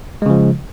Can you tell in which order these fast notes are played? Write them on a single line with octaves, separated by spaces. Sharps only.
G#3 C#3 F3